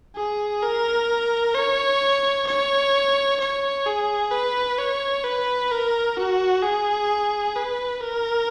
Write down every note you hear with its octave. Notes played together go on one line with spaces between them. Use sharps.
G#4
A#4
C#5
C#5
C#5
G#4
B4
C#5
B4
A#4
F#4
G#4
B4
A#4